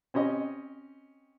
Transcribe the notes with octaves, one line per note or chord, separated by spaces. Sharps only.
C4 C#4 G4 D#5